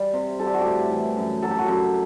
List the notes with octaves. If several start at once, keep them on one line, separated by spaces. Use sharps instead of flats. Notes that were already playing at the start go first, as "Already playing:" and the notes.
Already playing: G3
C3
G3 A4
G4
F#4
A2 G4
E3
F#2
F#3 A4
G4
F#4
F#2 G4